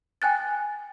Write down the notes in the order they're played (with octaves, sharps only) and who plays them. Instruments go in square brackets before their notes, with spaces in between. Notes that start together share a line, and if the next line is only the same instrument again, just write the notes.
[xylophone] G5 G#5 F#6 A6